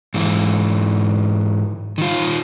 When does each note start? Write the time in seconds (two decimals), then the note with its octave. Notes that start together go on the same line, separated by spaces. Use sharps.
0.14 G#2 E3
1.98 D#3 F4